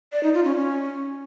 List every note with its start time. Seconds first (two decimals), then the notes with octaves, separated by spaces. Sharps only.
0.12 D5
0.23 D#4
0.34 F4
0.45 C#4
0.56 C#4